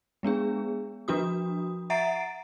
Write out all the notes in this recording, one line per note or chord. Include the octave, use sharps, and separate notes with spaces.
G#3 B3 D4 G#4
F3 D4 F#4 D#6
E5 F#5 A#5 A6 C7 D7